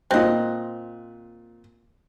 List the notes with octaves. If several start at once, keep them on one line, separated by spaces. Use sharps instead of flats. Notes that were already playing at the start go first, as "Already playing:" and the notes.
A#2 C4 D#5 F#6